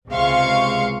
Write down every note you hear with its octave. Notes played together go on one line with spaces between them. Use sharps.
C#2 C3 G#3 F5 C6 C#6